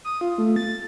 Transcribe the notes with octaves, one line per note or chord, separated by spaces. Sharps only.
D#6
F4
A3
A6